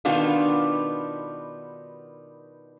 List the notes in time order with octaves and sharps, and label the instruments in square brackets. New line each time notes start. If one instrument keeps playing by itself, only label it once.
[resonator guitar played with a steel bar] B2 D#3 G3 B3 D4 F4